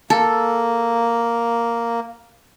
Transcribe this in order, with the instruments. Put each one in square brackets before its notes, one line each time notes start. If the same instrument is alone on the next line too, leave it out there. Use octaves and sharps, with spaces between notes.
[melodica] A#3 [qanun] A4